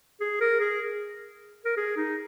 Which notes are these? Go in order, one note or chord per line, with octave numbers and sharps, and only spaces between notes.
G#4
A#4
G#4
A#4
G#4
D#4